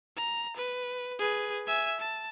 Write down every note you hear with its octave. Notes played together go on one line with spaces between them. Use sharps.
A#5
B4
G#4 B4
E5 G#5
A5